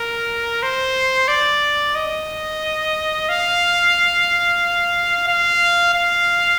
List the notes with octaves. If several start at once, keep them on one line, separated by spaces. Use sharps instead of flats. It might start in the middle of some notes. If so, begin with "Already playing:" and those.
Already playing: A#4
C5
D5
D#5
F5
F5
F5